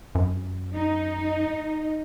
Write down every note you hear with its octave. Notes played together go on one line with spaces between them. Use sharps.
F#2
D#4